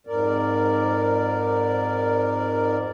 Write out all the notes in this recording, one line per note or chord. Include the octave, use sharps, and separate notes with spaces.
F2 G#2 A#4 D5